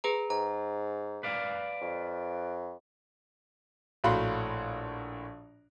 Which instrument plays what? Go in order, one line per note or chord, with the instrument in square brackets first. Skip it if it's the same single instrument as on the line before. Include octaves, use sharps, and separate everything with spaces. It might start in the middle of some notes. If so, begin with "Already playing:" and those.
[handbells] G#4 B4 A#5
[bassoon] G#2 [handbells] A#5
[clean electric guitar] B4 D5 F5
[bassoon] F2
[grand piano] A#1 A2 F#4 F5 B5 C6